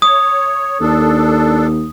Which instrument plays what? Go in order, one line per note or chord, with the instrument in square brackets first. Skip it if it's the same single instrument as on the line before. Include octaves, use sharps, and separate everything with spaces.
[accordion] C#5 [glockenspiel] D#6
[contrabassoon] D#2 [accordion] D4 A4